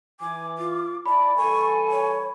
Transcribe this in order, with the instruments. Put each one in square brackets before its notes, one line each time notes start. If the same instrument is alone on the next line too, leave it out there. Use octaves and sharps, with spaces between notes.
[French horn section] E3 [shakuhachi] G#5 [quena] D6
[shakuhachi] F4
[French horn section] E4 D5 [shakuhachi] A5 [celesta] B5
[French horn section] E3 G3 A4 [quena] G#5 [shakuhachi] C#6
[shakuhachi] C#5